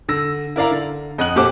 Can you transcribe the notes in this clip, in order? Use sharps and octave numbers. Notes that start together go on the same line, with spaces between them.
D3 E6 A#6
E4 A#4 D5 F5 A#5
D3
F2 D#5 F#5 F#6 F#7
A#2 F#4 G4 A4 C5 D6